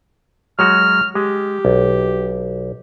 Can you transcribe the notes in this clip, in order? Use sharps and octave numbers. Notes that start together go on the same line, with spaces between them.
F#3 G#3 F#4 F6
G#3 G4
B1